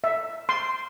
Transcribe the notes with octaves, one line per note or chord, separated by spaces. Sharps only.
E5
C6